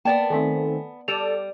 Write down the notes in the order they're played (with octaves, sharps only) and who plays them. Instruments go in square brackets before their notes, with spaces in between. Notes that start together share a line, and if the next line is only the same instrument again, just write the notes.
[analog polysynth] A#3 [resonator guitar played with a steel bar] B3 D5 A5 [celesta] G5
[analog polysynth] D#3 A3 C4 [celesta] A4 G#5 B6
[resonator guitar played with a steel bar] G3 [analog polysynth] A4 D5 [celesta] E7 F7